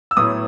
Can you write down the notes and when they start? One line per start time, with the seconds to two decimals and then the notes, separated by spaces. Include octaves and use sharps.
0.11 E6
0.17 A2 F#3 B3 D#6